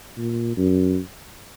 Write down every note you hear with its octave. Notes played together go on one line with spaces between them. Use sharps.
A#2
F#2